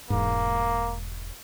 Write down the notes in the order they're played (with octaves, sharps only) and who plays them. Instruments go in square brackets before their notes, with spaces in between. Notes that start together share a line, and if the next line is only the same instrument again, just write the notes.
[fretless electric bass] E1 G#2 [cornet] A#3